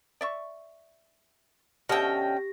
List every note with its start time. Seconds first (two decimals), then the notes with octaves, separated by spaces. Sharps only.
0.21 D5 E5 C#6
1.89 B2 D3 C#4 G4 E5 G5 A#6